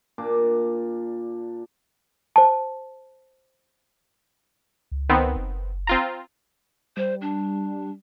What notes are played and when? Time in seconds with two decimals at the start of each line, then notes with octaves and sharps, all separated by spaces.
0.18 A#2 D4 D6
2.36 C5 A5
4.91 C#2
5.09 D#3 B3 C4
5.36 F#1
5.87 C4 F4 A#5
6.97 G3 C5
7.21 D4